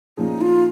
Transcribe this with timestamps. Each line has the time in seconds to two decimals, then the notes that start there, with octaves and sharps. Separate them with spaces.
0.17 A#2 F3 C#4 D#4 G#4
0.41 F4